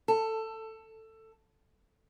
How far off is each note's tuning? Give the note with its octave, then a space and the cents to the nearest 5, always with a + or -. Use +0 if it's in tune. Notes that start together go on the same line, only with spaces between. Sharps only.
A4 +15